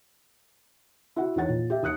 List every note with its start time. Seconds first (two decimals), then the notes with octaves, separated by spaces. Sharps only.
1.16 E4 F#4 F#5
1.36 E2 D#3 C#5 F#5 A6
1.49 A#2
1.70 G4 E5
1.83 D#2 D#6 F#6 C#7